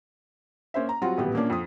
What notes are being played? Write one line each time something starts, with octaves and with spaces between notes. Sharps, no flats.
A#3 C#4 C5 E5
A#5
F#3 G3 C4 F4 F#4
D#1 A1 G3 B3
A#2 A#3 C#4 D4
F2 D#6